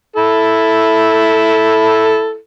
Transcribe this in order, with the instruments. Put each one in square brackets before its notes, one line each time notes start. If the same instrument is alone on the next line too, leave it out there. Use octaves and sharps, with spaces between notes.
[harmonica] E4 A4